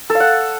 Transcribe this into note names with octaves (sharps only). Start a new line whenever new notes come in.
A4
F5
F#5